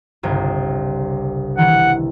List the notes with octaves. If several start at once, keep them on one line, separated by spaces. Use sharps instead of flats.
G1 C2 C#3
D#3 E3 A3 F#5